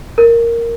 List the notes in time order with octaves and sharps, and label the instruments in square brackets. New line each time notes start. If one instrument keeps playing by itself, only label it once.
[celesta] A#4